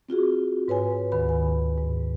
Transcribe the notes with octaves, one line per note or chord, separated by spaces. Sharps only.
C4 F4 F#4 G#4
G#2 B4 C#5 G#5
D2 D#3 B4 B5
G#5
G#2